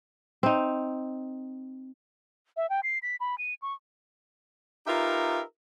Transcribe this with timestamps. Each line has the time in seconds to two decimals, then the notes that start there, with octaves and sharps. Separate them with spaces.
0.43 C4 D#4
2.57 E5
2.70 G5
2.83 C7
3.03 B6
3.20 B5
3.38 D#7
3.62 C#6
4.87 D#4 F4 G4 A#4 B4 E5